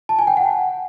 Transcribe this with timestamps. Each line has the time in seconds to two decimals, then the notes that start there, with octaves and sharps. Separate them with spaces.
0.09 A5
0.19 G#5
0.27 G5
0.37 F#5